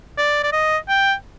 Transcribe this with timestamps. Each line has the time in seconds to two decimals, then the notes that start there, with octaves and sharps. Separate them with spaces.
0.17 D5
0.43 D5
0.52 D#5
0.89 G5